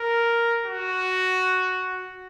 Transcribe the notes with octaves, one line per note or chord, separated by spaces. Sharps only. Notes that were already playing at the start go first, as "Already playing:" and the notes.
Already playing: A#4
F#4